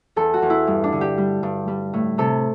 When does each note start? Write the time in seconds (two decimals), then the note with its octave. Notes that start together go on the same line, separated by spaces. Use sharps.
0.16 E2 A4
0.34 F#4
0.42 E2
0.50 E4
0.67 G2
0.84 D4
0.92 D3
1.01 G4
1.18 G3
1.43 G2
1.68 G3
1.93 A2
2.18 C3 A4